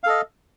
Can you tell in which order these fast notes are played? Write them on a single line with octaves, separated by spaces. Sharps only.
F5 A4 D#5